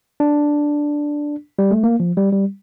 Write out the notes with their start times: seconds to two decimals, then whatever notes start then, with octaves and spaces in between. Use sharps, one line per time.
0.20 D4
1.59 G3
1.71 A3
1.84 A#3
2.00 F3
2.17 G3
2.33 G3